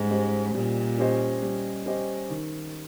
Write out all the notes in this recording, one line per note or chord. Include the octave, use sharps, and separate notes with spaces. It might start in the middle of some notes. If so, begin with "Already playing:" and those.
Already playing: G#2 G3 C#4 D#5
C#4 G4 C5 D#5
A#2 G3
C#4 G4 C5 D#5
G3
C#4 G4 C5 D#5
D#3